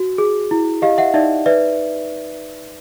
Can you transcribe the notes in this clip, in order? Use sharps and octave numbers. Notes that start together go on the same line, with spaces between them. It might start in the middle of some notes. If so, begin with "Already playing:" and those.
Already playing: F#4
G#4
E4
G4 D#5 F5
E5 F#5
D#4 D5 E5
B4 D5 E5